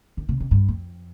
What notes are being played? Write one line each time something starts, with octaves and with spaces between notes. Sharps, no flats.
D#3
C3
C3
G2
F2